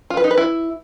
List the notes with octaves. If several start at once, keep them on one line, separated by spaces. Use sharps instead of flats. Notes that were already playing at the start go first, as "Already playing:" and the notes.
F4
B4
D#4
B4
E4